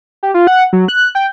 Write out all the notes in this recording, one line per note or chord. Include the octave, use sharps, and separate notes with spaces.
G4
F4
F#5
F#3
F#6
G5